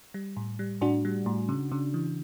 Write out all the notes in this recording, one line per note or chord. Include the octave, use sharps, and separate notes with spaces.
G3
A2
G3
A2 D4 F#4
G3
A2
C#3
C#3
E3